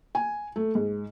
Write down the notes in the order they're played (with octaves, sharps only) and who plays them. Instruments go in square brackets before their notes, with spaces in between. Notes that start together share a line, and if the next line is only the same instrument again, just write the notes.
[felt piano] G#5
A3
G#2